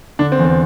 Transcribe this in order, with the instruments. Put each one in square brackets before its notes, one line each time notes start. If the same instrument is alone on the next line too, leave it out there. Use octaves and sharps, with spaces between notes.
[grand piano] D3 D4
C4
E2
C4